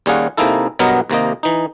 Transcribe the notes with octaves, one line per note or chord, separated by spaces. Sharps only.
D#2 G3 C#4 G#4 F5 F#5
C3 G#3 A#3 D#4 E4 A4
G2 B2 F#3 B3 A#4 D#5
D#2 C3 A#3 D#5
E3 D#4